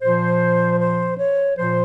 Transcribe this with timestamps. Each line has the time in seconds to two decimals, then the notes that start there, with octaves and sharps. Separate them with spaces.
0.02 A#2 F3 C5
0.80 C5
1.17 C#5
1.57 A#2 F3 C5